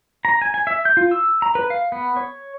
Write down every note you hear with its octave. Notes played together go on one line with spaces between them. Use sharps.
A#5
G#5
G#5
E5
G6
F4
E6
A#5
B4
F5
B3
C#5